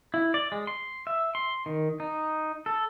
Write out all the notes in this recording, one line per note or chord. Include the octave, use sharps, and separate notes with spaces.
E4
D5
G#3
C6
E5
C6
D#3
D#4
A4